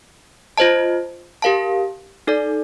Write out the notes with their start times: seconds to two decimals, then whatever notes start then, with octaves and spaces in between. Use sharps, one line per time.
0.58 F4 C5 D#5 A5
1.42 G4 A#4 F5 A5
2.27 D#4 A4 D5